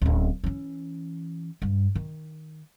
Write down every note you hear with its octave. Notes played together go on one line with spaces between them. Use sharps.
D1 C#4
E3 C#4
G2
D#3